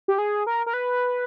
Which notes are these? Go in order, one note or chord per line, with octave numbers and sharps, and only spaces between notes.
G4
G#4
A#4
A#4
B4